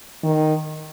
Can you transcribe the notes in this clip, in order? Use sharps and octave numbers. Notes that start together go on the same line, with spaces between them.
D#3